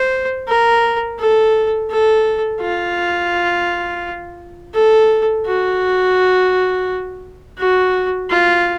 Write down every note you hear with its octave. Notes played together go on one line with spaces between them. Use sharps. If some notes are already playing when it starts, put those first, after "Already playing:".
Already playing: C5
A#4
A4
A4
F4
A4
F#4
F#4
F4